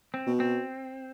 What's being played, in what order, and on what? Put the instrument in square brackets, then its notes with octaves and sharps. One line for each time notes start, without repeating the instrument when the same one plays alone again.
[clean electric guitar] C4
[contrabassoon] B2
[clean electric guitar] C4